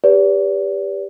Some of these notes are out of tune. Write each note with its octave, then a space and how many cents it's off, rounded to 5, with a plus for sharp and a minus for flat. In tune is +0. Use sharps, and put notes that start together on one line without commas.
G4 +15 B4 +0 D5 -35